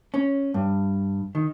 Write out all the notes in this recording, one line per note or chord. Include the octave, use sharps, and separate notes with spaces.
C#4
G2
D#3